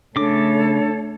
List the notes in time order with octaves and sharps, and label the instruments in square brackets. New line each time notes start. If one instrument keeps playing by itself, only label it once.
[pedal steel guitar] C#3 D6 [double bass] A3 [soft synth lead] D4 [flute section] A4 C#5